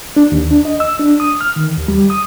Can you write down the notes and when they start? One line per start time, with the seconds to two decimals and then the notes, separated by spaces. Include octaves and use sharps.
0.16 D4
0.32 D#2
0.51 D4
0.65 D#5
0.80 E6
0.99 D4
1.20 D#6
1.41 F6
1.56 D#3
1.77 D#2
1.88 G3
2.10 D#6